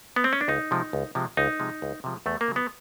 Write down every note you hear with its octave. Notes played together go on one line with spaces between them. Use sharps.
B3
C4
C#4
D4
C#2 D#4
C3 F3 G#3
C#2
C3 F3 G#3
C#2 D#4
C3 F3 G#3
C#2
C3 F3 G#3
E2 A3
A#3
C#3 F#3
B3